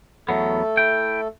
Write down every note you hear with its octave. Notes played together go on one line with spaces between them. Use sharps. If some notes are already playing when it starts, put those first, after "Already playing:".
E2 F#3 A3 B3 A4
E4 G5